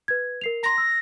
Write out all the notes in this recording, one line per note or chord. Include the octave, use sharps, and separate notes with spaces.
B4 G#6
A#4 C7 F7
A#5 C6 A#6
E6